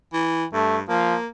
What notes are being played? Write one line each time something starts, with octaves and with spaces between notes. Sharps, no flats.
E3
G2 A3
F3 A#3